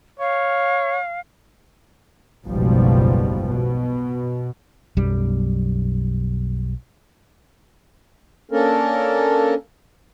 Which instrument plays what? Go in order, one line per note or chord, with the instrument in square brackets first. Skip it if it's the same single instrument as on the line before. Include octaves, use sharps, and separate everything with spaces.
[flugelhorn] C#5 [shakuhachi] F5
[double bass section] F#1 B1 G#2 B2 F3 G3
B2
[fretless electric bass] B1 F#2 G3
[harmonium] A#3 C#4 D4 A4 A#4